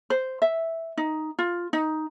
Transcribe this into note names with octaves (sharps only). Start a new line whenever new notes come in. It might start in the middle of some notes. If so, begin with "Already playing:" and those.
C5
E5
D#4
F4
D#4